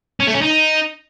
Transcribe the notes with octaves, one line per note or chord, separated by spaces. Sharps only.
C#4
A3
C#4
D#4